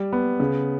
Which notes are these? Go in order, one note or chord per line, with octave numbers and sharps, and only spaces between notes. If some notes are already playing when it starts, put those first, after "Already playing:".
Already playing: G3
B3
C#3